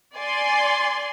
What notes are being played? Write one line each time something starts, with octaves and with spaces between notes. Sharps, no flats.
D5 G#5 C6